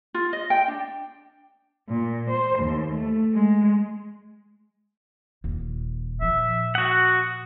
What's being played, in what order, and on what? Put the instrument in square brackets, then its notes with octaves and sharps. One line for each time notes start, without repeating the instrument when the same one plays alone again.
[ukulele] F4
D#5
G5
D4
[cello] A#2
C5
D#2
A3
G#3
[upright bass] D#1 A#3
[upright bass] A#2 F3 [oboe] E5
[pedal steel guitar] F#4 F#5 [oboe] D#6